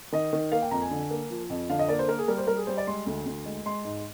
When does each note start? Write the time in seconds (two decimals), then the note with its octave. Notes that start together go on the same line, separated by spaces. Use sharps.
0.12 D#3 D#5
0.33 D#3
0.52 A#3 F5
0.62 G5
0.71 F2 A#5
0.82 G#5
0.91 D3
1.11 A#3
1.30 F3
1.50 F2
1.70 D3 F5
1.79 D#5
1.89 A#3 D5
1.99 C5
2.09 A#3 A#4
2.19 G#4
2.28 G3 A#4
2.38 C5
2.47 G3 A#4
2.57 G#4
2.67 G3 C5
2.78 D5
2.87 G#3 C6
3.07 D2
3.26 D2
3.46 G#3
3.66 G#3 C6
3.85 G#2